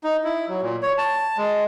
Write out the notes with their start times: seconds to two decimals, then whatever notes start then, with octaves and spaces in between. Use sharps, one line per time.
0.04 D#4
0.24 E4
0.48 F#3
0.62 A#2
0.83 C#5
0.98 A5
1.37 G#3